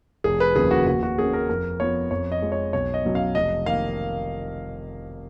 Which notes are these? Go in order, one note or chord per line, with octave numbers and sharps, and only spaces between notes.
F1 G#4
B4
D#2 C#3 F3 A#3 G#4
F#4
D#2 F#4
F#4
D#3 A#3 C#4 G#4
A#4
F2 A#4
F3 B3 C#5
F2 C#5
D#5
F3 G#3
C#5
B1 C#5
D#5
B2 F#3 C#4
F5
F1 D#5
D#3 A#3 F5